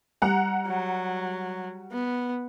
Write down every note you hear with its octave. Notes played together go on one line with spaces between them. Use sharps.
G3 F#5 A#5
F#3
B3